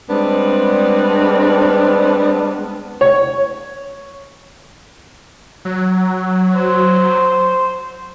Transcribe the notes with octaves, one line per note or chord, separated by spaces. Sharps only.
G3 G#3 B3 C4 D4
C#5
F#3
C5